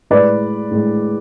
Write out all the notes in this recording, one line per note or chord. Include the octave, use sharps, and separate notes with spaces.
A2 G#3 B4 D5
A2 G#3